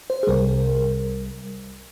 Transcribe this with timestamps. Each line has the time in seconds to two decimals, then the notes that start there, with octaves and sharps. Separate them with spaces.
0.10 C5
0.23 G#4
0.27 C2 C3 G3 A#4